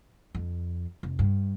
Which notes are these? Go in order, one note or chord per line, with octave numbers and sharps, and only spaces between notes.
F2
F1
G2